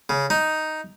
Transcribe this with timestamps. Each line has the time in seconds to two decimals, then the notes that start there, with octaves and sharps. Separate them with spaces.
0.09 C#3
0.30 D#4